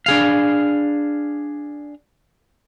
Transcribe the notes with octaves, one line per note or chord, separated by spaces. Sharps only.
D4 G#4 F5